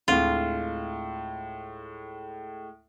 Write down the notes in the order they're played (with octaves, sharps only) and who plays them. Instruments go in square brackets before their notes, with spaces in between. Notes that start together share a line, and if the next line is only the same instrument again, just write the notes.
[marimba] D2 C4 F5 [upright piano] A2 G#3 [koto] F4